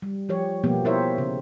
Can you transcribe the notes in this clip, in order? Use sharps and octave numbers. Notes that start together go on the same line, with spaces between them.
G3
F3 G4 C#5
B2 F3 A#3 B3 G4
E4 G4 A#4 C5 C#5 E5
C#3